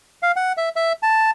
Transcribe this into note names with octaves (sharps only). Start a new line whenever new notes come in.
F5
F#5
E5
E5
A5